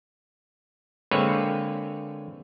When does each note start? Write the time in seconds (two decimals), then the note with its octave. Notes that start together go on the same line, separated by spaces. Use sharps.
1.11 D3 G#3 A#3 C4 B4 C#5